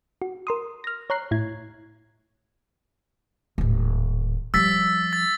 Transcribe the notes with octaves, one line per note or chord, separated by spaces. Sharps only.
F#4
A#4 C6 D#6
F6 A#6
C#5 A#5 F#6 C7
A2 E4 G#6
D#1 A2
F3 G3 E6 A6 B6
A6